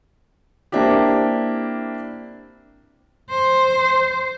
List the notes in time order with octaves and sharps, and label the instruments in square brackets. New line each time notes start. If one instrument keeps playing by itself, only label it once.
[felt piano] A#3 C4 D4 E4 G4
[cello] C5